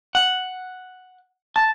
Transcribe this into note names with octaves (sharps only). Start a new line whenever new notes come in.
F#5
A5